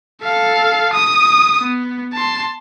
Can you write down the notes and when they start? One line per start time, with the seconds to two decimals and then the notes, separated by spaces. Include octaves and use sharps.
0.22 A4 F5
0.93 D#6
1.60 B3
2.13 A5 C6